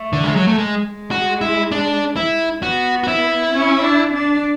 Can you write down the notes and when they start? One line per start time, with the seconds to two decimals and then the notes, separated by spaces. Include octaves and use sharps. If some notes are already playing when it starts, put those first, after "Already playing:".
Already playing: A3
0.13 D3
0.24 G#3
0.36 F#3
0.48 A3
0.58 G#3
0.81 G#3
1.11 F#4
1.41 E4
1.72 D4
2.16 E4
2.62 B3 F#4
3.03 F#4
3.08 E4
3.53 C#4
3.83 D4
4.14 D4